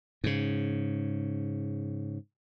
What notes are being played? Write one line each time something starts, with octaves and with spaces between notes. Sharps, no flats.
G#2 C#3